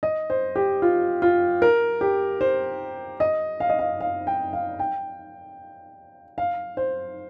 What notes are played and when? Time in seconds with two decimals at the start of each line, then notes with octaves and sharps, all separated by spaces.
0.03 D#5
0.30 C5
0.56 G4
0.82 F4
1.22 F4
1.62 A#4
2.01 G4
2.41 C5
3.20 D#5
3.60 F5
3.69 D#5
3.79 F5
4.01 F5
4.27 G5
4.53 F5
4.79 G5
6.38 F5
6.77 C5